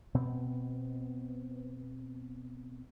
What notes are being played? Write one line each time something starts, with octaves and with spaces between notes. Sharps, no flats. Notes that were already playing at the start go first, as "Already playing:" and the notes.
B2 B3 C4